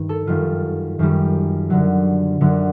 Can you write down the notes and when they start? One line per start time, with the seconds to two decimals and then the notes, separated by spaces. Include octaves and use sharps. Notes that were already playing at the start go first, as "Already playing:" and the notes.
Already playing: G2 D#3
0.09 A4
0.27 F#2 D#3 G3 F4
0.99 F#2 D#3 G3
1.70 F#2 D3 F#3
2.41 F#2 D3 F#3